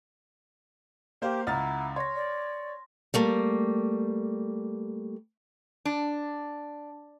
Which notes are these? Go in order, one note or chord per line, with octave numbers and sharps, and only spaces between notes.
A#3 G4 C5 F5
C#2 E4 F#5 A#5 F6 A6
C#5 C6 A#6
D5
G3 A3 A#3
D4